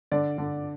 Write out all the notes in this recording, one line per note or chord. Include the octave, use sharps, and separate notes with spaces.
D3 D5
D3